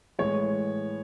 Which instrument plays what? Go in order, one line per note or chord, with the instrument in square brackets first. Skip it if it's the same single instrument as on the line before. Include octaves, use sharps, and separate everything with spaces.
[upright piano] A2 E3 G#3 [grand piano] C#5